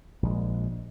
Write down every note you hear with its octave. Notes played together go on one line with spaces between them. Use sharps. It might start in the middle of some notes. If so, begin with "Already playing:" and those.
A#1 G#3